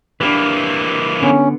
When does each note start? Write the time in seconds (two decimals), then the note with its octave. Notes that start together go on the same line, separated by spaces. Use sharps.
0.21 E3 A#3 D4 G4 B4
1.22 D3 B3 C#4